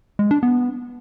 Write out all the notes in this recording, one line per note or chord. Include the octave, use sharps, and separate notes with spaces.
G#3
D4
B3